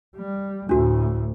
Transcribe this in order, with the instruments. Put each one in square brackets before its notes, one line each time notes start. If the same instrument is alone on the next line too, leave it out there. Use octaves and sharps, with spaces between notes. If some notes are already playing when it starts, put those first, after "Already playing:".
[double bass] G3
[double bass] D2 A2 [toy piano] D4 F#4